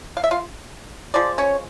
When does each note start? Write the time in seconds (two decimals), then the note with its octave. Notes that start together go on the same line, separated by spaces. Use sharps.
0.17 F5
0.24 E5
0.31 F4 F5
1.14 F3 G#3 D5
1.38 C#4 C#5